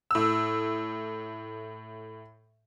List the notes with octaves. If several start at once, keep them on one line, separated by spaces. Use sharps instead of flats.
A2 E6